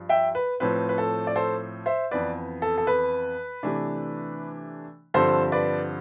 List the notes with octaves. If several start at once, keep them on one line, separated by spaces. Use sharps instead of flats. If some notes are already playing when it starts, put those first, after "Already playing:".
Already playing: G2 F3
E5 G5
B4
A2 F3 C4 B4
B4
A4
D5
A4 C5
C5 E5
F2 E3 B3 B4 D5
A4
A4
B4
C3 E3 A3 D4
G2 D3 F3 C4 A4 C5
B4 D5